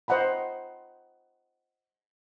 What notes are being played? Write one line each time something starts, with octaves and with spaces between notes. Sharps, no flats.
C5 D#5 F#5 A#5 B5